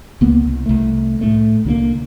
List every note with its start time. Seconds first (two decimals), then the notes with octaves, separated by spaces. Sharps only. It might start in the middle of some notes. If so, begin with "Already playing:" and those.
0.21 C#2 A#3 B3
0.45 C2
0.66 C2 A3
1.21 A2 A3
1.65 C2 D3 D#3 A#3